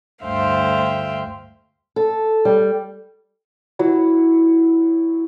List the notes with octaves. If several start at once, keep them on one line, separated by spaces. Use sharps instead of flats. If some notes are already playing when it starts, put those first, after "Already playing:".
D2 G2 C5 E5 F5 G5
A4
G3
F#3 E4